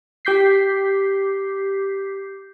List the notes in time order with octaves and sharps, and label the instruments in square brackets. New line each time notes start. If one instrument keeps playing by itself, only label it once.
[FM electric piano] G4 D6 G6 B6 C7